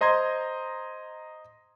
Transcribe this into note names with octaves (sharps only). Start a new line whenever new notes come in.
C5 D#5 A#5 C6 G#6